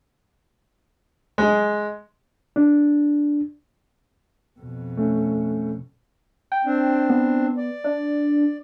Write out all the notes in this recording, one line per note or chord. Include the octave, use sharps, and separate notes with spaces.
G#3
D4
F2 B2
A3 C#4
G5
C4 D4
B3
D5
D4